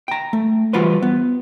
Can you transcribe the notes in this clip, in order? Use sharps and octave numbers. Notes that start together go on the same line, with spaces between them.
G5 A#5
A3
E3 G3 F4 F#4 B4 C5
B3